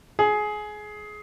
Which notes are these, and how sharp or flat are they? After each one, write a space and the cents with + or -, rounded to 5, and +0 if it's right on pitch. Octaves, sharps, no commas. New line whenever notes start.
G#4 +20